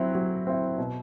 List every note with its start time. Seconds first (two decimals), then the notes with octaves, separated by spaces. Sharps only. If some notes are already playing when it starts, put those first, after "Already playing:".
Already playing: F#3 C4 E4
0.15 F#3
0.47 C4 E4
0.78 B2